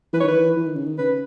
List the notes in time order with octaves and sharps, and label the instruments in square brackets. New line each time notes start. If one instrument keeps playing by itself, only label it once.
[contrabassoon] E3 [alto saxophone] B4
[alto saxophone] C#5
[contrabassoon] D#3 [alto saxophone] B4
[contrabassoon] E3
E3
D#3
C#3
D#3
[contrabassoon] C#3 [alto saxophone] B4